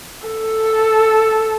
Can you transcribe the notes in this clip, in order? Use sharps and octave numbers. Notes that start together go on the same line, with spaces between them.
A4